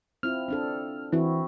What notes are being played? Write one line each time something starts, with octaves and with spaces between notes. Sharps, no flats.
C4 E4 F4 F6
C4 D4 A4
E3 C4 E4 F#4